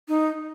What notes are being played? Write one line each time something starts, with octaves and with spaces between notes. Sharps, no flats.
D#4